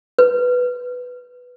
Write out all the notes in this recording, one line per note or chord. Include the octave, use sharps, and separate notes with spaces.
B4